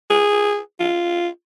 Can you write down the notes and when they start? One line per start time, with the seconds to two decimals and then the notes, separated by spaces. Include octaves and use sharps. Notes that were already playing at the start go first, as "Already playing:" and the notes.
0.10 G#4
0.80 F4